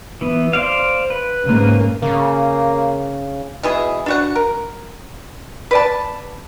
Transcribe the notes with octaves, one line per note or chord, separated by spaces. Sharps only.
E3 B3
C5 D5 F5
B4
G#2 C#3 A#3
C#3 A#3
B2 E3 G#4
D4 F#4 F#5
A#4
B4 D5 A5